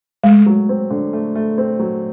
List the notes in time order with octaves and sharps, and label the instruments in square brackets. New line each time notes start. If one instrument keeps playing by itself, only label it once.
[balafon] G#3 [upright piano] A3
[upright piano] F#3
C4
D3
A3
A3
C4
F#3